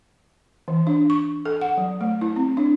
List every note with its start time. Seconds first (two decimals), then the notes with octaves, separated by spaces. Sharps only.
0.68 E3
0.87 D4
1.10 C#6
1.45 A4
1.61 F#5
1.78 F#3
2.01 A3
2.21 E4
2.36 C4
2.57 D4